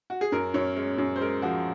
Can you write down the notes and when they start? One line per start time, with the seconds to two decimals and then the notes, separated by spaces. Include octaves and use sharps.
0.10 F#4
0.21 G#4
0.32 F#2 A#4
0.54 F#2 C#5
0.76 G#3 C#5
0.98 F#2
1.16 C5
1.21 G#3 A#4
1.42 F3 F#4